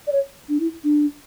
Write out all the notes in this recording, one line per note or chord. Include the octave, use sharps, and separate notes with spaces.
D5
C#5
D4
E4
D4